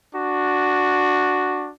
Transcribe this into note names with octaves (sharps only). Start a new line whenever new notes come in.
D4 F#4